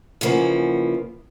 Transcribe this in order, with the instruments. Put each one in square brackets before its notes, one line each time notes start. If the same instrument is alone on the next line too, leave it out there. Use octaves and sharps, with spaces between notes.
[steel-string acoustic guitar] E2 C#3 F3 A#3 B3